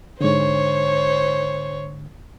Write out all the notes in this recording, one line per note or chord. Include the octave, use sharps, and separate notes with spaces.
G#2 D3 C5 C#5